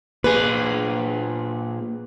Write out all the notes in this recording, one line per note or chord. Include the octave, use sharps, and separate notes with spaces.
A#2 G#4 B4